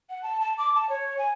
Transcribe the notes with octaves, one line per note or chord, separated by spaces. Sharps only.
F#5
A5
A5
D6
A5
C#5
G#5